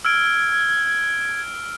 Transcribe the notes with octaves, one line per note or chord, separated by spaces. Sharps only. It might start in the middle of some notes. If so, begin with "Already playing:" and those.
E6 F6 G#6 D7